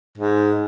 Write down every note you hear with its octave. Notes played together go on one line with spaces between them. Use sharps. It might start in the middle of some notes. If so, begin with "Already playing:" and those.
G#2